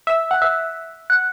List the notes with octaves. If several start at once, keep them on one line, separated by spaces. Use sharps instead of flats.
E5
F#5
E5
F#5